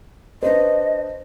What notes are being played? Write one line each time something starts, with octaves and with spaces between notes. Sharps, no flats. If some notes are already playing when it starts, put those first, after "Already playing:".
D4 B4 C5 D#5